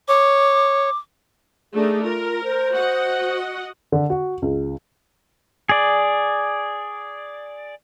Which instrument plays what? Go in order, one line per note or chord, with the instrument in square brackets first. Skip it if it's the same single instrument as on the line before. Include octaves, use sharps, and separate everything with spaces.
[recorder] C#5 [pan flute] D6
[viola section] A3 D4 D#4 [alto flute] G#4
[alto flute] F4 [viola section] A#4
[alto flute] C5
[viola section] F#4 D#5 F#5
[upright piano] D3
F#4
C#2
[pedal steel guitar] G#4 D5